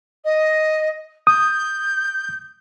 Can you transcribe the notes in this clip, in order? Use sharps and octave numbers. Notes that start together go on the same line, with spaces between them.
D#5
D#6 G6